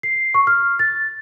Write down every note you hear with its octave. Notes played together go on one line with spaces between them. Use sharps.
C7
C#6
F6
A6